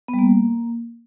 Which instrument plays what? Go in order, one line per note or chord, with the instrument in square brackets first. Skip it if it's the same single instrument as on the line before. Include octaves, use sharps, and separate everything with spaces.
[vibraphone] B3
G3
A#3